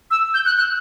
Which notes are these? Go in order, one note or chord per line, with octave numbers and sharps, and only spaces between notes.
E6
G6
F#6
F#6